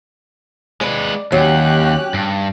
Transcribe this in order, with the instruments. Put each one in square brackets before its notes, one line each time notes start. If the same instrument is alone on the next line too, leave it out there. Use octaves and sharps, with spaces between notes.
[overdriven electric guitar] G#3 B4 [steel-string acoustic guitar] D5
[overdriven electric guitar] D#2 [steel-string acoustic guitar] F#3 [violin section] C#4 G4 F#6
[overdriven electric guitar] G2